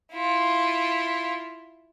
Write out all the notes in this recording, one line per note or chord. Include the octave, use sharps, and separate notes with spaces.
E4 F4